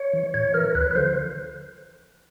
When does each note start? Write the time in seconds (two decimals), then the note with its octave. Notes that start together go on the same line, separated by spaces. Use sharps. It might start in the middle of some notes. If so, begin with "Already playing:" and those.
Already playing: C#5
0.13 E3
0.34 A2 C#5
0.54 E3 A#4
0.75 D2 B4
0.91 B4
0.95 D3 F3 C5